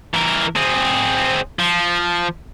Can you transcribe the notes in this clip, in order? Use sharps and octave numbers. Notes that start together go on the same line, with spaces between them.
E3 A#4
C4 G#4
F3